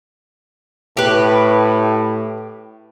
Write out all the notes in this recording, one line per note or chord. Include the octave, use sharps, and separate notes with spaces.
A2 G4 B4